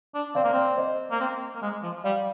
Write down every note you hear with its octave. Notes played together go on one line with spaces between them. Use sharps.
D4
C4 D5 F5
A#3
C4 D5
C5 D#5
A#3
C4
A#3
G#3
F3
G3 D5 F5